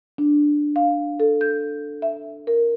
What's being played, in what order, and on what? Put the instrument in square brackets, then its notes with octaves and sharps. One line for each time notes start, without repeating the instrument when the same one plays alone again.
[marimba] D4
F5
A4
G6
E5
A#4